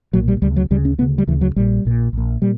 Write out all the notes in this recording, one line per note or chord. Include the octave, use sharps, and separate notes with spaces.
B1 A#2 F#3
G3
D2 C#3 G3
F#3
D2 C#3 G3
C#4
D2 C#3 B3
G3
D2 C#3 E3
F#3
A#1 A#2 G3
A#1 A#2
A#1 A#2
A#2 G3